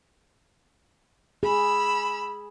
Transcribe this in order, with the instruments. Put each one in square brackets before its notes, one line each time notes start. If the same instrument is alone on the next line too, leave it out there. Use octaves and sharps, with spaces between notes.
[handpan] G#4 [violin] B5 E6